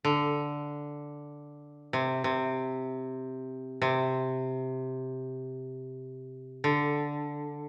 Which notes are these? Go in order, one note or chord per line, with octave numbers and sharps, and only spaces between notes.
D3
C3
C3
C3
D3